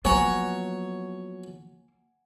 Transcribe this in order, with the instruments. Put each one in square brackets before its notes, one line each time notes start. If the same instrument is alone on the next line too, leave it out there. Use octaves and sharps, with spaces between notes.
[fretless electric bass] F3 F#3 B3 [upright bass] A#3 [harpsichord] C#5 [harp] F#5 G#5 A#5